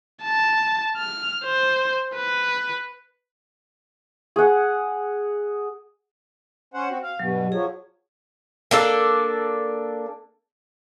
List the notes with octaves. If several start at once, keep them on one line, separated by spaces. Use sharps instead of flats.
A5
F6
C5
B4
G#4 F#5
C#4 C5 F#5
C4 F#4
F5
G2 B2 F#3
F3 F#3 G#4
A#3 D4 A4